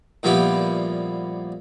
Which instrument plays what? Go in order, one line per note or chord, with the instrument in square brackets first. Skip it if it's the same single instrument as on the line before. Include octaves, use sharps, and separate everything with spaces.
[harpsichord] A#2 F3 G3 B3 E4 G4